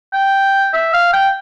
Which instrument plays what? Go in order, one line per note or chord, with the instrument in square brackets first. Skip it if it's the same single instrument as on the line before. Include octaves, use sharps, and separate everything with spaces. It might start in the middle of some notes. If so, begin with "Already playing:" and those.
[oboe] G5
E5
F5
G5